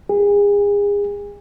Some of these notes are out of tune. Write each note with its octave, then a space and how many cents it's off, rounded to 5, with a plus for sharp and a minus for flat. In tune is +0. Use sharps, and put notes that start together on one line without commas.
G#4 -35